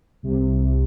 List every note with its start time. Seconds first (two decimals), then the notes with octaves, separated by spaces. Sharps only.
0.23 C2 C3